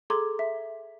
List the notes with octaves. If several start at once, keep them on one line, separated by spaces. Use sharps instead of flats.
G#4 A4 A#5 C6 D6 G#6
E5